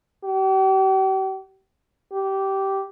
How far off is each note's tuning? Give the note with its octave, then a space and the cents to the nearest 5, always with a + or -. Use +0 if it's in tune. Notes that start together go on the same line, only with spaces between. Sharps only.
G4 -40
G4 -15